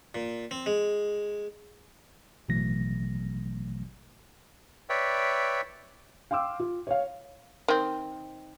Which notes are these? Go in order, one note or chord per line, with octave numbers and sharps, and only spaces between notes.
A#2
C4
G#3
A1 B2 E3 F#3 A3 A#6
B4 C#5 D5 E5 G5
F5 G5 C6 D6 E6
F4
C#5 F5
D#3 C4